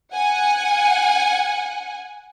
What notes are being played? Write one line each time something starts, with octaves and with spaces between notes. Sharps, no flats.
F#5 G#5